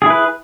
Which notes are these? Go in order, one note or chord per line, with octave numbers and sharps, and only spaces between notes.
E4 G#4 B4